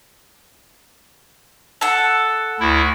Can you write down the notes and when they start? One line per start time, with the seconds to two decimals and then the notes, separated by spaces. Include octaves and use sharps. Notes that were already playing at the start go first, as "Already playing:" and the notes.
1.81 A4 F#5
2.60 D2 E4